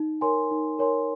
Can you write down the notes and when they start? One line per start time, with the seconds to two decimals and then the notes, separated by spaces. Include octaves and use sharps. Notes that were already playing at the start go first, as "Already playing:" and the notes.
Already playing: D#4
0.21 A#4 C#5 G#5 C6
0.51 D#4
0.79 A#4 C#5 G#5 C6